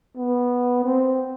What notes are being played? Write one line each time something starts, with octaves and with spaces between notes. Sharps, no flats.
B3
C4